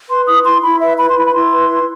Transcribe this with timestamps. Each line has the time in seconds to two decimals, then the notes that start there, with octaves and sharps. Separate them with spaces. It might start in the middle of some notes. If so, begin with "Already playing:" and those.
0.09 B4 C6
0.27 E4 D#6
0.45 E4 C6
0.63 E4 B5
0.81 B4 E5
0.99 B4 B5
1.10 C6
1.16 E4 B5
1.26 B5
1.34 E4 C6
1.52 B4
1.70 B4